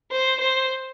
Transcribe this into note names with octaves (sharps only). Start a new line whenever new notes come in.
C5
C5